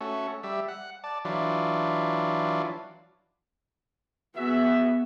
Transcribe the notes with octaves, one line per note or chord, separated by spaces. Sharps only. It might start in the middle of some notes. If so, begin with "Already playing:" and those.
A3 C#4 F#4
G3 E5
F#5
D5 A5
E3 F#3 D4 F4
B3 F#4 G#4 E5